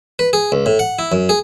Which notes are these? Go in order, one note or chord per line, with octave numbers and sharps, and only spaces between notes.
B4
G#4
C#2
A2
F#5
E4
F#2
G#4